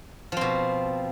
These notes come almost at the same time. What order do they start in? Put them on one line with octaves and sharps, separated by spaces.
F3 C4 B2